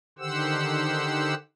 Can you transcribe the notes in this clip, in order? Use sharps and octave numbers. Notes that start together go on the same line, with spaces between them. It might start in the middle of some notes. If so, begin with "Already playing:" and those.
D3 D#3 G4 C5 F#5 E6